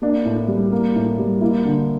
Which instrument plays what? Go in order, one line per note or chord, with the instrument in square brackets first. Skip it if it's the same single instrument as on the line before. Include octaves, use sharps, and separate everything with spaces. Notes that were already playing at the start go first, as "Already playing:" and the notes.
[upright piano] A#3 D4
A2
G3
A#3
A2
G3
A#3 E4
D3